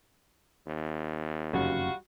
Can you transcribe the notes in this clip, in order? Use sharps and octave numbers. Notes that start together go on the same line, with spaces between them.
D#2
F1 F#2 C#3 G3 F4 F#4